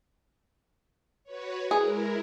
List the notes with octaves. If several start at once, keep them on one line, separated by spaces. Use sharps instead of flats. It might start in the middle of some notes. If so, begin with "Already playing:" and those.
F#4 B4 C#5
G#3 E4 G#4 A#4